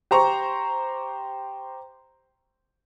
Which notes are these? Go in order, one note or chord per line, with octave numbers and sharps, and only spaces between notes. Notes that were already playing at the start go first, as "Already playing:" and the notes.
G4 C5 A#5 C#6